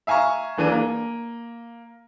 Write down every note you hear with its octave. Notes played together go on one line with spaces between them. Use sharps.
E5 F5 G#5 A#5 C#6
D#2 E3 D4 D#7
A#3